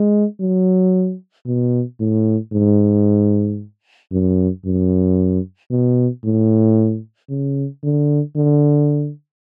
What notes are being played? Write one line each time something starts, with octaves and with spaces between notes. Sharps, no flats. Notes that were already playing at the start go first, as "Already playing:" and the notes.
Already playing: G#3
F#3
B2
A2
G#2
F#2
F#2
B2
A2
C#3
D3
D3